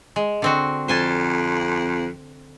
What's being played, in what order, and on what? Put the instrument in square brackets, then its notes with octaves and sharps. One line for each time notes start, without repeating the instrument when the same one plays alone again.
[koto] G#3
D3 C4 F#4
[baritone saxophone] F2 [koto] C5 G#5 A5